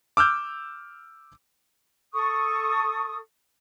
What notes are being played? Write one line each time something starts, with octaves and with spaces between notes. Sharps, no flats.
D6 E6 F6 G6
A4 C#6 D#6